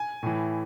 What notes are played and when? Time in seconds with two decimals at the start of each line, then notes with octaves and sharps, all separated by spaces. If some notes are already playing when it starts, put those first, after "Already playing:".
Already playing: G#5
0.23 A2 E3